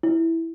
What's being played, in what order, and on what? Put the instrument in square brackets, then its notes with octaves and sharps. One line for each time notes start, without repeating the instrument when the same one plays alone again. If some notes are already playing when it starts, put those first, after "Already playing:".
[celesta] E4